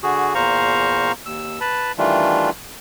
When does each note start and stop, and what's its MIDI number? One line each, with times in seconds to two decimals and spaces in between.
0.03 0.33 50
0.03 0.33 66
0.03 0.33 68
0.35 1.12 40
0.35 1.12 46
0.35 1.12 72
0.35 1.12 77
0.35 1.12 82
0.35 1.12 85
1.26 1.59 39
1.26 1.59 88
1.61 1.92 71
1.61 1.92 81
1.61 1.92 83
1.98 2.50 51
1.98 2.50 52
1.98 2.50 55
1.98 2.50 57
1.98 2.50 62
1.98 2.50 65